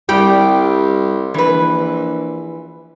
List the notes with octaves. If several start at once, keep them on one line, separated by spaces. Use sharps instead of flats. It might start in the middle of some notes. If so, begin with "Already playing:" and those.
C2 G3 G5
A#1 E3 B4